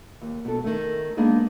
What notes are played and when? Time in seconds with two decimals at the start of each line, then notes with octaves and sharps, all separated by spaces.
0.22 D#2
0.45 B2 A4
0.64 D#3 A3
1.17 G#3 A#3 B3 D4 D#4 G#4